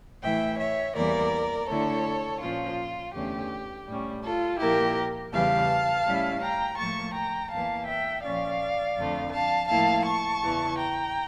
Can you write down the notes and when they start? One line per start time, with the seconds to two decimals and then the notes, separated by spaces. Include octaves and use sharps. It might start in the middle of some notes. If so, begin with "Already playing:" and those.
0.22 A2 E3 A3 E4 E5 G5
0.59 C#5 E5
0.95 E2 E3 G3 A#3 A#4 D5
1.68 D3 A3 E4 A4 C#5
2.41 A#2 F3 C#4 F4
3.14 E2 D3 A3 C#4 G4
3.87 A2 G3 C#4
4.23 F4 A4
4.59 A#2 F3 A#3 E4 G4 A#4
5.32 E2 C#3 E3 G3 F5 A5
6.05 A2 G3 C#4 E4
6.42 G5 A#5
6.78 A2 F3 A#3 A5 C#6
7.14 G5 A#5
7.51 E2 E3 A#3 F5 A5
7.87 E5 G5
8.23 A#2 F3 C#4 D5 F5
8.96 F2 D3 F3 A3
9.33 F5 A5
9.69 A2 F3 A#3 E4 F5 A5
10.05 A5 C#6
10.42 E2 C#3 E3
10.78 G5 A#5